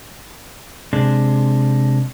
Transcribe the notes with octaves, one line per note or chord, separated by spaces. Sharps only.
C3 G#3 D4